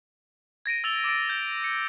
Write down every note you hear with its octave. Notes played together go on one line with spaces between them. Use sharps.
G#6 A#6 D7 D#7
E6 A6 F7 G7
D6 E6 A6 D7
G6 G7
C#7